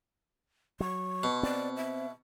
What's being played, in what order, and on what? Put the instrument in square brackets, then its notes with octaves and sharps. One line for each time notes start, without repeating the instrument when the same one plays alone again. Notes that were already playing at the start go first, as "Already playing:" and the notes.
[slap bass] F#3 [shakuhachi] C#6
[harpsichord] B2
[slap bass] C4 [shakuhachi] D5
[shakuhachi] E5